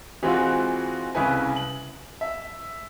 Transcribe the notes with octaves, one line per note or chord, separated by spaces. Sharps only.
E3 G#3 C4 F4 F#4
C2 C#3 E4 B4 G#5
F#7
E5